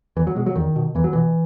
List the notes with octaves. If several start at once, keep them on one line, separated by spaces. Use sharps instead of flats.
E2 E3
F#3
B2 G#3
F#3
E2 D#3
B2
E2 E3
F#3
B2 E3